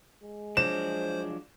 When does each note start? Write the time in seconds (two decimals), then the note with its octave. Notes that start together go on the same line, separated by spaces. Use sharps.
0.23 G#3
0.57 F3 F#3 D4 C5 E7